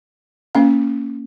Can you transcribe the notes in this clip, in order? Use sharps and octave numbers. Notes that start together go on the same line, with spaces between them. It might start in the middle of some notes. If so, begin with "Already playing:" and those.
A#3 C#4 F5